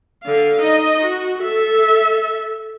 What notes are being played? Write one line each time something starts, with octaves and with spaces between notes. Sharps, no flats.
D3 F5
D#4 D#5
F#4
A4 E5